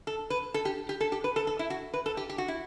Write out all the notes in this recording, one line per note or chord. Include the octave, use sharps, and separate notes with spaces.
A4
B4
A4
G4
G4
A4
G4
B4
A4
A4
E4
F#4
B4
A4
G4
G4
F#4
E4